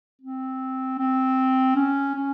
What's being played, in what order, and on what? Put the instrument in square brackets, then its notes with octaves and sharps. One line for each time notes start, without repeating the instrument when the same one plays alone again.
[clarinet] C4
C4
C#4
C#4